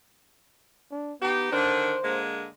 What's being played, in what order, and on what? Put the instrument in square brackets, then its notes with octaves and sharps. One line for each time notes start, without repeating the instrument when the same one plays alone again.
[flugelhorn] D4
[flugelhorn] B3 [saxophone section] D#4 G4
[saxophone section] D3 D#3 D4 [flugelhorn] C5
[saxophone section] D3 G#3 A#3